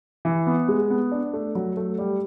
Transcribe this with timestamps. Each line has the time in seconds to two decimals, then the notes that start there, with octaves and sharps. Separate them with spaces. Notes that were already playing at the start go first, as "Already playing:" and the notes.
0.25 E3
0.47 B3
0.68 G#3
0.90 B3
1.12 D4
1.34 A3
1.55 F#3
1.77 A3
1.98 G3